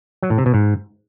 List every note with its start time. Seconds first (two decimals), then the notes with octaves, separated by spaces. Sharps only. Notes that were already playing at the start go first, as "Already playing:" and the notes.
0.23 F#3
0.30 A2
0.38 C3
0.46 B2
0.54 G#2